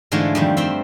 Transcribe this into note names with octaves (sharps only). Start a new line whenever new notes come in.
G#2 D3 E3 G#3 A3 F4
F2 D#3 G3
G2 C4 E5 C6